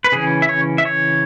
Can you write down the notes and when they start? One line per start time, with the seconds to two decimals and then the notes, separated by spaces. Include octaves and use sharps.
0.04 B4
0.12 C#3 E3 C#4 G#4
0.42 E5
0.49 C#5
0.78 E5
0.85 C#5